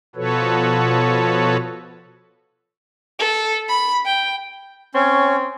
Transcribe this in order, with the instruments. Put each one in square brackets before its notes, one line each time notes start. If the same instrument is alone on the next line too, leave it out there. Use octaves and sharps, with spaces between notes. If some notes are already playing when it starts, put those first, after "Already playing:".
[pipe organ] B2 F3 F#4 A4 B4 C#5
[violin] A4
B5
G5
[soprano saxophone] C4 [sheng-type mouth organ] C#4 [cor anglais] C#5